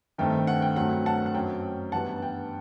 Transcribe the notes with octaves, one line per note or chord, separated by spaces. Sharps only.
G2 D#3 A3 C4 G5
F#5
G5
G2 F#3 A3 C4 F#5
F#5 A5
F#5
F#2 F#3 C4 G5
G2 E3 G3 B3 F#5 A5
G5